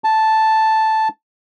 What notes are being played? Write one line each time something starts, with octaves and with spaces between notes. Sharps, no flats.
A5